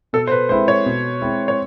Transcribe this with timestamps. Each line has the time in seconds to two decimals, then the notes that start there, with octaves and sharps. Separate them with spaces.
0.13 B2 A4
0.27 C5
0.32 B4
0.49 G#3 C4 E4 C5
0.68 C#5
0.86 B2
1.22 G#3 C4 E4
1.48 C#5